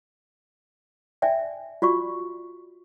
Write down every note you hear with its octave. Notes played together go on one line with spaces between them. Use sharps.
D5 E5 G5 G#5
F4 F#4 D5 C#6